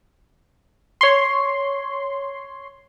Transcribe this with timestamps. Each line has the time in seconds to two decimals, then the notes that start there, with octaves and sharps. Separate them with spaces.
1.01 C#5 C6